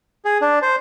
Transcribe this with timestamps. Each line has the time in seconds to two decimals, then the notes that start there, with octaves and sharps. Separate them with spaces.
0.25 G#4
0.41 D4
0.62 C5